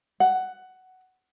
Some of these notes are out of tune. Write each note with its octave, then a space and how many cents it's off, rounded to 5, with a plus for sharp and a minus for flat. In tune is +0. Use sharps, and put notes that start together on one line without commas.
F#5 +10